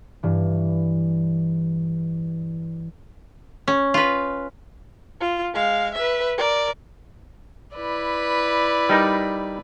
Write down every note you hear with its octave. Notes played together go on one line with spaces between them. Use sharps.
G2 E3
C#4
F4 B4
F4
G#3 F5
B4 E5
A#4 D5
E4 B4 D5
G3 D#4 A#4